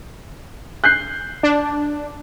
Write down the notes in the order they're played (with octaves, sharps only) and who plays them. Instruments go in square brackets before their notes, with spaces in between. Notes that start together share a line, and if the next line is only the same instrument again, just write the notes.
[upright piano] F#6 G6 C7
[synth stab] D4